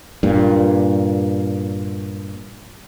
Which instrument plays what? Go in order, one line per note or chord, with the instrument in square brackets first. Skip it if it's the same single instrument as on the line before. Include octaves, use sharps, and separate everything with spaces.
[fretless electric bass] G2 A#2